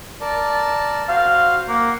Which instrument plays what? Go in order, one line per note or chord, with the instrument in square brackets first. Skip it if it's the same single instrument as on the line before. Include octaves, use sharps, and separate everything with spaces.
[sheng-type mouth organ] A#4 D5 A5
[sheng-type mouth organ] F#4 C5 C6 [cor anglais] F5
[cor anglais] A#3 [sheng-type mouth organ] F#5